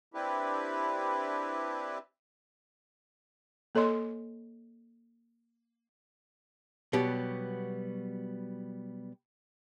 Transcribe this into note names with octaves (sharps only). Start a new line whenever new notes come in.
C4 D4 E4 G4 B4
A#3 A4 C#5 D#5 C6
B2 F#3 G3 B3 G4